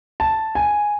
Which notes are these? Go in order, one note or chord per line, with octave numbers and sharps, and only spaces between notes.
A5
G#5